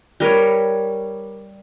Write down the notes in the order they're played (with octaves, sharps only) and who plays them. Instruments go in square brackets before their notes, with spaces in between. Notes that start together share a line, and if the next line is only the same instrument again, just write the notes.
[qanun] G3 A#4 B4 C#5